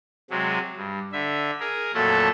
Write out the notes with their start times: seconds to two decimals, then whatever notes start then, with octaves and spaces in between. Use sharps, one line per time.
0.30 C3 F#3 G#3
0.76 G2
1.12 D3 E5
1.60 G#4 A#4
1.94 F2 A#2 F#3 A3 A4 A5